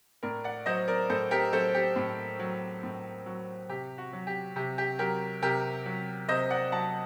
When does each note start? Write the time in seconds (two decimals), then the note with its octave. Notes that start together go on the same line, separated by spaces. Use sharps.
0.23 A2 A#4 D5
0.44 D5 F#5
0.66 F#3 C5 D#5
0.88 A#4 D5
1.10 A2 A4 C5
1.31 G4 A#4
1.53 F#3 A4 C5
1.75 G4
1.96 A2
2.40 F#3
2.83 A2
3.26 F#3
3.69 C3 G4
3.98 F#4
4.13 F#3
4.27 G4
4.56 C3 G4
4.78 G4
4.99 F#3 G4 A#4
5.42 C3 G4 A#4
5.86 F#3
6.29 C3 C5 D#5
6.50 D5 F#5
6.72 F#3 F#5 A5